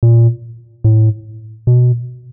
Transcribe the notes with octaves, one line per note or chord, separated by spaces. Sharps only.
A#2
A2
B2